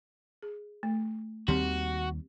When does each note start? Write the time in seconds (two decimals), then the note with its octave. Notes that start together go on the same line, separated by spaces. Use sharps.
0.43 G#4
0.83 A3
1.48 D#2 D#3 G3 C4 F#4 G4 C6